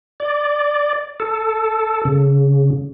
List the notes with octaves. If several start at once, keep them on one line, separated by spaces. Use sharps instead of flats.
D5
A4
C#3